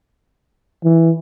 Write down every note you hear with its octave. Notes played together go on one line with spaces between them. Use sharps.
E3